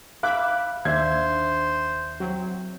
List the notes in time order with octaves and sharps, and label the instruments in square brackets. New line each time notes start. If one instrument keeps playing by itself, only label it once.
[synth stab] E5 B5 D6 [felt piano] F5 F#6
[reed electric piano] D#2 E5 [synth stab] D4 [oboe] C5 [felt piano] G#6
[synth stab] F#3 C4